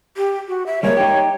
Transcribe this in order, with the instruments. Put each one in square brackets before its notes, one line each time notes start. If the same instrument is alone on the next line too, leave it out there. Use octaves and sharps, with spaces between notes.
[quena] G4
F#4
E5
[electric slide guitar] G3 G#3 A#3 [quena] C#5
[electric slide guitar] D#4 G4